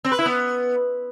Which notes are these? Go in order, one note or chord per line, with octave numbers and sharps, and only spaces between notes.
C4
B4
E4
B3